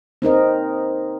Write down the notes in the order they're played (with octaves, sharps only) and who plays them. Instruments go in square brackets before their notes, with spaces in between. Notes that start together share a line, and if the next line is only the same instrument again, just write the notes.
[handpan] C4 D#4 A#4 D#5